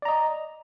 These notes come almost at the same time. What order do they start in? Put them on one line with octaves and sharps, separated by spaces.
D5 A#5 D#5